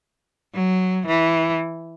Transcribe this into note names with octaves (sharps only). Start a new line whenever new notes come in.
F#3
E3